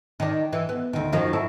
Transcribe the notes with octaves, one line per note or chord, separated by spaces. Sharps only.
D#3 D4
E3
B3
D2 D#3
F#2 D#3 F3
F#3 E4 A4